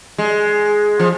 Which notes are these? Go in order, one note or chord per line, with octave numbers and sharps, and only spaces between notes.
G#3
F3